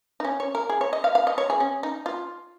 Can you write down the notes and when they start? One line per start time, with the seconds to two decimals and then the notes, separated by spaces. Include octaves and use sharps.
0.20 D#4
0.25 C#4
0.40 C#5
0.55 A#4
0.69 G#4
0.81 C#5
0.93 D#5
1.04 F5
1.15 F5
1.27 D#5
1.38 C#5
1.50 G#4
1.60 C#4
1.83 D#4
2.06 F4